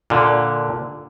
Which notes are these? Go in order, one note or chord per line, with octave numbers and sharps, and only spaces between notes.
A#2 D3